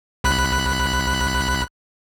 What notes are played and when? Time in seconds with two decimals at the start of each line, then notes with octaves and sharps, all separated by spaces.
0.24 C2 B5 F#6